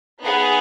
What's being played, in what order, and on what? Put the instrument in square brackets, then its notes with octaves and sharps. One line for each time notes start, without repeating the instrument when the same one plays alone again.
[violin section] B3 D#4 G#4